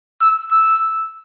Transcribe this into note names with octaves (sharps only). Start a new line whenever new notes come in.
E6
E6